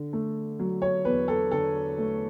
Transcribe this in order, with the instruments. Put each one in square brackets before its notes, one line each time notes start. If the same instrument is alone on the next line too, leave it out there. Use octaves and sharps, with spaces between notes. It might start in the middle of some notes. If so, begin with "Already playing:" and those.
Already playing: [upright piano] D3
A3
F#3
C#5
E2 B4
A4
D3 A4
A3